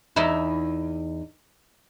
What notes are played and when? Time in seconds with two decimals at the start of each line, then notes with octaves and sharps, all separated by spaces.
0.16 E2 D#4 E4